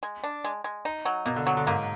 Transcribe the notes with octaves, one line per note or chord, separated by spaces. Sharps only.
G#3
D4
G#3
G#3
D#4
F#3
B2 A#3
D3
F#3
D3
G#2 A#3